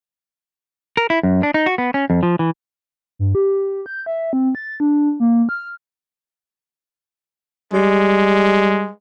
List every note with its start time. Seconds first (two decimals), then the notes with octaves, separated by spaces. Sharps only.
0.97 A#4
1.10 E4
1.23 F#2
1.43 D4
1.54 D#4
1.66 F#4
1.78 B3
1.94 C#4
2.10 F2
2.23 F3
2.39 E3
3.19 G2
3.35 G4
3.86 G6
4.06 E5
4.33 C4
4.55 A6
4.80 D4
5.20 A#3
5.49 F6
7.73 G3 G#3